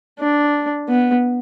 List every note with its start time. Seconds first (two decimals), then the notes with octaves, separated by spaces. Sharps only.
0.20 D4
0.88 B3